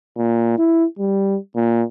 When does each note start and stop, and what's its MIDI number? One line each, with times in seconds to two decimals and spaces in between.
0.17 0.57 46
0.58 0.85 64
0.99 1.37 55
1.56 1.83 46